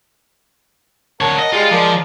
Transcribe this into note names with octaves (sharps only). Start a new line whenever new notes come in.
D3 A#4 C#5 F#5 A5
D#5
G3 G#3 F4
F3 G#3 A#4 D5